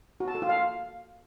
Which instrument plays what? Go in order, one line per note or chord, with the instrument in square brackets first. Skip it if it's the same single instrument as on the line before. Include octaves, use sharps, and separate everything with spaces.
[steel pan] F#4
A5
A4
F4
F5